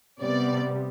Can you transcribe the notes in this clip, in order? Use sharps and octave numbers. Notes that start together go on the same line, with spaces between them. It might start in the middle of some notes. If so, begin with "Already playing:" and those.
C3 G3 B3 D5